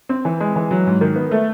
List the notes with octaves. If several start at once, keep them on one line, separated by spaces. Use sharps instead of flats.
C4
E3
G#3
E3
F#3
G#2
D#3
B3
A3